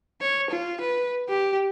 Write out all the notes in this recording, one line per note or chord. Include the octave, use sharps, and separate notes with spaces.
C#5
F4
B4
G4